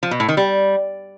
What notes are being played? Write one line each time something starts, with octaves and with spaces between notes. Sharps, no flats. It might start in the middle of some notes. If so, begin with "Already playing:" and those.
F3
B2
A2
D#3
G3